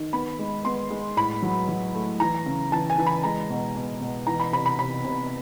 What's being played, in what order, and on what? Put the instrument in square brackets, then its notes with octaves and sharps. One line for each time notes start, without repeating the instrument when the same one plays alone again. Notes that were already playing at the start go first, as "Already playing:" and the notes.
Already playing: [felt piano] D#3
B3 B5
G#3
B3 C6
G#3
A2 B5
F#3
F#3
A3
E3 A#5
C#3
E3 A5
G#5
E3
B5
G#3 A#5
B2
B2
B2
E3 A#5
B5
C3 B5
B5
C3 B5
C3